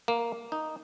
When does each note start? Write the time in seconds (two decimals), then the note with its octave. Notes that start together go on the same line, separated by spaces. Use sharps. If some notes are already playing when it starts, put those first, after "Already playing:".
0.08 A#3
0.52 D#4